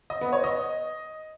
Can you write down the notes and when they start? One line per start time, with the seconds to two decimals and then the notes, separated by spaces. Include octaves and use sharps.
0.10 D#5
0.21 B3
0.33 C#5
0.44 D#5